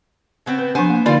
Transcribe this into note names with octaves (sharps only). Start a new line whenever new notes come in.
C#3 B3 C4
B4
F3 B3 D4 C5 G#5
A#3
D3 G3 D#4 F4 D5 F5